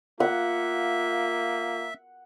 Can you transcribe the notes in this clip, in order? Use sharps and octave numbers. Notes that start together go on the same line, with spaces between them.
A#3 F4 E5 F#5